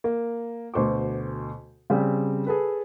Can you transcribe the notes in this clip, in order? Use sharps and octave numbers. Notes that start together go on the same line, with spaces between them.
A#3
D2 B2 C5 C#6 D6
C#3 G3 C4
G#4 A4 B4